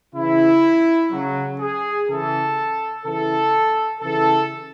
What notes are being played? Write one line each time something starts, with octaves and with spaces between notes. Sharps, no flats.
C#3 E3 E4
C#3 F#3
G#4
C#3 E3 A4
C#3 E3 A4
C#3 E3 A4